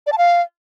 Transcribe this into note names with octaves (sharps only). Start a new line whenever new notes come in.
D5
A5
F5